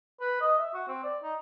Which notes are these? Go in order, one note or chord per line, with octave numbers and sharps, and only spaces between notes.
B4
D#5
E5
F#4
C4
D5
D#4